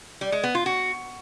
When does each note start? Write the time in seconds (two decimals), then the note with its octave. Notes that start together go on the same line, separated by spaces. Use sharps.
0.21 G3
0.32 G#3
0.44 B3
0.55 F4
0.66 F#4